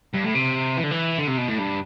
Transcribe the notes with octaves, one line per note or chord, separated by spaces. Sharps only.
G2
A2
C3
E3
D3
E3
D3
C3
B2
A2
G2